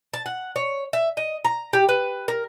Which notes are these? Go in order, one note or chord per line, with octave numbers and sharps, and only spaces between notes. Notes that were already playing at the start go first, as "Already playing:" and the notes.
A5
F#5
C#5
E5
D#5
A#5
G4
B4
A#4